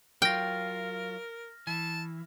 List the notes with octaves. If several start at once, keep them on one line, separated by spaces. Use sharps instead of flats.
F#3 F4 A#4 G5 F6 A#6
E3 A5